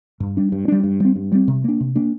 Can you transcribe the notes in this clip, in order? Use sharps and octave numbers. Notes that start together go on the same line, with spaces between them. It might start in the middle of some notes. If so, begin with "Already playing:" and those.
G2
G3 D4
G2
G3 D4
G2
G3 C4
G2
G3 C4
C3
A#3 D4
C3
A#3 D4